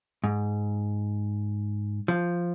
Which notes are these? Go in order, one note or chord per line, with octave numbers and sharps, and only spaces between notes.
G#2
F3